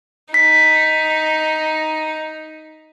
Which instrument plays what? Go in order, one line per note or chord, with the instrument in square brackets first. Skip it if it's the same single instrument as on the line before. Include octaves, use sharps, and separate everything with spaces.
[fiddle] D#4 [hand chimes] B6